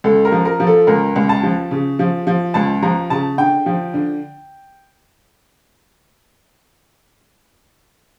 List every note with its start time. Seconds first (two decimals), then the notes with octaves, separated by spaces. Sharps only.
0.04 C#2 A4
0.25 A#4
0.32 F3
0.45 A#4
0.60 F3
0.67 A4
0.87 C#2 A#4
1.16 C#2
1.29 A5
1.43 F3
1.71 C#3
1.99 F3
2.27 F3
2.54 C#2 A5
2.82 F3 A#5
3.10 C#3 A5
3.38 D3 G5
3.66 F3
3.94 D3